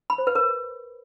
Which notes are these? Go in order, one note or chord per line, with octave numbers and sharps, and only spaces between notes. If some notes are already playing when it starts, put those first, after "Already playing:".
B5
C5
B4
A#4